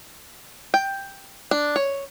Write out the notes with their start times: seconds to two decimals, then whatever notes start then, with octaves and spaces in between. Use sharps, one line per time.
0.74 G5
1.51 D4
1.76 C#5